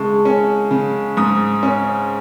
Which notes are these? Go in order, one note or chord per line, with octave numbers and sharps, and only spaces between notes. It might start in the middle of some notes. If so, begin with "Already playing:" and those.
Already playing: C#3 G#3 A5 C#6
C#4
C#3
G#2 D#6
C#4